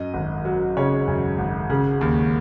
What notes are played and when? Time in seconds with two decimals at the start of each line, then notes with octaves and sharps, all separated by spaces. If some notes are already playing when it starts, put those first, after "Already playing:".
Already playing: F#2 D#5
0.14 G#1
0.45 F#3
0.77 C#3 C#5
1.08 F#2
1.38 G#1
1.70 C#3
2.01 D#2